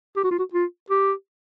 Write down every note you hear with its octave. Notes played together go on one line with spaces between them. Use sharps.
G4
F#4
F4
F#4
F4
G4